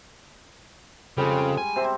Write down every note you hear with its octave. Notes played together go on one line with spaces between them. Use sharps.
F2 C#3 G3 G#3
G#5
C3 C4 C5